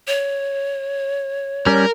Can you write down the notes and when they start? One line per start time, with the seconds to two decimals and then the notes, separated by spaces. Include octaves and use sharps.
0.07 C#5
1.66 G3 C#4 A#4